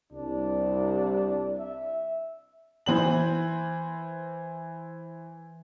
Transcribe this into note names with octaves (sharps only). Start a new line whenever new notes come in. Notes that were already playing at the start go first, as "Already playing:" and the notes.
C2 D4
E5
E3 C5 F#7